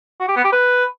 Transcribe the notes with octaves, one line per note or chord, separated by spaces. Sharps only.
F#4
G4
B3
G4
B4